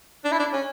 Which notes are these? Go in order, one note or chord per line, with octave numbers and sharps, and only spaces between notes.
D4
E4
D4
C#4